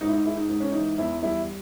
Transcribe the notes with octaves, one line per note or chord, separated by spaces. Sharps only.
G#2 D#4
E4
D#4
G#3 E4
D#4
G#2 D#4
C#4
E3 D#4
E2 E4
G3 E4